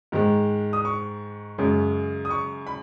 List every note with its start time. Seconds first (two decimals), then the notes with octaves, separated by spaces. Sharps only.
0.12 G#2 D#3 G#3
0.73 D#6
0.85 C#6
1.58 F#2 C#3 G#3
2.25 D#6
2.31 C#6
2.67 B5